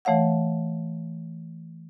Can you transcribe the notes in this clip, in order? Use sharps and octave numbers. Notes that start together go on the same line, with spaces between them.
E3 A3 C#5 F5 F#5